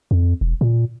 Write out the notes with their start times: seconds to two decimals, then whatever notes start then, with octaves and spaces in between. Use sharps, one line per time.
0.11 F2
0.41 E1
0.61 A#2